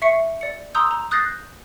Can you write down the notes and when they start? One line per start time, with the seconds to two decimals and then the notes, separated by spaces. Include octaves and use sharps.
0.02 E5 C#6 C7 C#7
0.41 D5 C#7
0.75 A#5 C6 D#6 E6 G6
0.91 A#5
1.11 D#6 F#6 G6 A6 A#6 C7